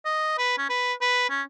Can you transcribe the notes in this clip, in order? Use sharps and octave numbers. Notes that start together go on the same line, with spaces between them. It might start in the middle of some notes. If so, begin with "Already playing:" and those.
D#5
B4
C#4
B4
B4
C#4